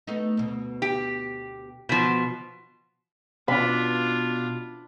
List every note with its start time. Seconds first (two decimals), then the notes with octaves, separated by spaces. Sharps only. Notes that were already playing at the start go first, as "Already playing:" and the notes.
0.07 A3 B3 D#4
0.37 D2 B2
0.82 G4
1.89 B2 F3 F#4
3.48 B2 D4 F4 B5